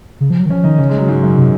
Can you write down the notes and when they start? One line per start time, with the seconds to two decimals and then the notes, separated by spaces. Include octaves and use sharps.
0.21 C#3
0.30 F3
0.40 F#3
0.46 D#3
0.50 F3 C#4
0.64 D#3 D#4
0.78 C#3 C#4
0.89 G#3
0.98 F#3
1.08 G#2
1.23 F#2
1.37 C3